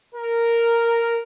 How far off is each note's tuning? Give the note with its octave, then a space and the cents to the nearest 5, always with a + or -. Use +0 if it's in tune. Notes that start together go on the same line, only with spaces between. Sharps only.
A#4 -5